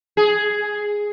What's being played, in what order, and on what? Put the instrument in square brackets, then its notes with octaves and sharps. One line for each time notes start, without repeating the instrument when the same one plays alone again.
[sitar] G#4